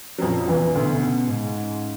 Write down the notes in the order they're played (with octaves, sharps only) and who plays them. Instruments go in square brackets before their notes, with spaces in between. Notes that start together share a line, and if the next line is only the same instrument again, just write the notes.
[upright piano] F#3
[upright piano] F2 F3 [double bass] A#2
[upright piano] E2 E3
[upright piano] D2 D3 [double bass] B2
[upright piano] C#3
[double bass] G#2